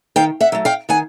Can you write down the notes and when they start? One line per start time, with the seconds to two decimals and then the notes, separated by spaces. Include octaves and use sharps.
0.16 D#3 F5 G5
0.40 E5 F#5
0.52 F#3 A3
0.65 F5 G5
0.89 D#3 F#5 G#5